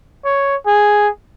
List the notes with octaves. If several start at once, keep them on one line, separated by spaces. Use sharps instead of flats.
C#5
G#4